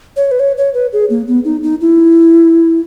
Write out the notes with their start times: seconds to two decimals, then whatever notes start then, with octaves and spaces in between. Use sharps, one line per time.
0.16 C#5
0.31 B4
0.40 C#5
0.58 C#5
0.74 B4
0.93 G#4
1.10 A#3
1.27 B3
1.45 D#4
1.63 D#4
1.81 E4